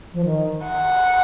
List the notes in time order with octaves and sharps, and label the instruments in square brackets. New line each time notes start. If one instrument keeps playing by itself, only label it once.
[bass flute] F3
D#3
[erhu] F#5